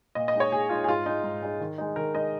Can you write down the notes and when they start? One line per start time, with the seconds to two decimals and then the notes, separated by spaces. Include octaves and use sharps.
0.15 A#2 D#5
0.28 D#5
0.34 G#3 D#4
0.40 C#5
0.52 A#2 G#4
0.69 G#3 D#4 F4
0.84 G#4
0.88 G#2 F4
1.06 G#3 D#4
1.24 G#2
1.42 G#3 D#4
1.60 D#3
1.78 G#3 D#4
1.96 D#3 A#4
2.14 G#3 D#4 D#5